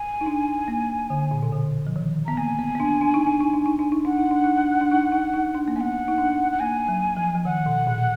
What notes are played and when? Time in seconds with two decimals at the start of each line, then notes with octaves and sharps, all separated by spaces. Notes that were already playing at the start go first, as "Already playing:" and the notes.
Already playing: G#5
0.21 D#4
0.26 D4
0.68 A#3
1.10 D3
1.31 A#2
1.43 B2
1.53 D3
1.87 F3
1.96 D#3
2.26 B3 A#5
2.37 A#3 G#5
2.59 B3
2.75 B3
2.80 D4
3.01 D4
3.14 D#4
3.27 D4
3.41 D#4
3.54 D4
3.66 D#4
3.79 D4
3.92 D#4
4.05 D4 F#5
4.18 D#4
4.31 D4
4.44 D#4
4.58 D4
4.81 D4
4.92 D#4
5.12 D#4
5.34 D#4
5.55 D4
5.68 A#3
5.76 B3 F#5 G#5
6.08 D#4
6.18 D4
6.52 F#5
6.60 A#3 G#5
6.88 F#3
7.17 F3
7.35 F3
7.45 D#3 F#5
7.66 B2
7.87 A#2